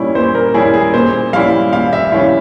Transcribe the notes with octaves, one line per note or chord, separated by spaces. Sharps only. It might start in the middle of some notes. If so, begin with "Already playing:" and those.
Already playing: A#2 G3 C#4 E4
A#2 C5
A#4
G3 C#4 E4 G#4
G#4
A#2 C5
G3 C#4 E4 F5
A#2 F5
E5
G3 C#4 E4 F5